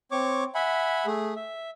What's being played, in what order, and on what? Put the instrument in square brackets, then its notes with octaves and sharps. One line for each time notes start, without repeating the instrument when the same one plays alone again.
[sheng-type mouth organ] C4 C#5 C#6 D6
E5 F#5 G#5 B5
A3 G#4
E5